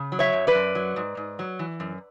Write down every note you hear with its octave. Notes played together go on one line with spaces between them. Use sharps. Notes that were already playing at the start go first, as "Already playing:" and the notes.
Already playing: C#3
F#3
C#5 E5
F#2
B4 D5
F#2
F#3
G#2
G#2
F#3
E3
F#2